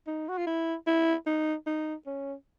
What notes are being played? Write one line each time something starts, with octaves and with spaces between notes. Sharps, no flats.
D#4
F#4
F4
E4
E4
D#4
D#4
C#4